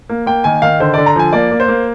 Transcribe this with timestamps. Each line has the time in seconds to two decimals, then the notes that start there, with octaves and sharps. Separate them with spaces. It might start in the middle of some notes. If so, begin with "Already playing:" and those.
0.09 A#3
0.26 A#3 G5
0.44 D#3 G#5
0.62 D#3 F5
0.80 D3 C5
0.94 D3 D5
1.06 A#5
1.16 F3 G#5
1.33 A#3 D5
1.51 A#3
1.60 C5
1.68 A#3